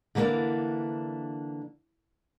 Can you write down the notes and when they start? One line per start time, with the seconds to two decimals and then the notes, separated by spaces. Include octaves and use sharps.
0.15 D3 E3 A#3 C4 D4